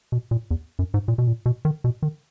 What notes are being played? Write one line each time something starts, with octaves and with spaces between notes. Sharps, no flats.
B2
A#2
E2
F#2
G#2
A#2
B2
A#2
B2
D#3
B2
D#3